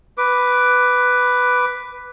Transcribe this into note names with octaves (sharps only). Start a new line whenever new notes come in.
B4 D6